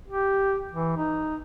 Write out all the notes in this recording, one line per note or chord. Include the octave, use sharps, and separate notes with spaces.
G4
E3
D#4